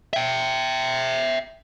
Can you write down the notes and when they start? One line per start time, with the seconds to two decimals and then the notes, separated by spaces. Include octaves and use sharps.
0.13 E5 G5